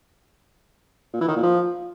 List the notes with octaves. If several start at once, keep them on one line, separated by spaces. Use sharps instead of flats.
A#2
E3
D#3
A#2
F3